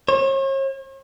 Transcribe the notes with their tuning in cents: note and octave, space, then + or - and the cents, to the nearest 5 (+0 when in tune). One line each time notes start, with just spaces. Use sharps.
C#5 -45